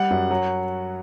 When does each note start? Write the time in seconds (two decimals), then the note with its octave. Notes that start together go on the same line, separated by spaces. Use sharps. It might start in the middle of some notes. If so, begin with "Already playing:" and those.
Already playing: G3 F#5
0.11 F#2
0.31 F#3